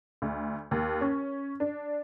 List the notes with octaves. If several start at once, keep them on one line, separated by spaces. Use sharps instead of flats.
D2
D#2
C#4
D4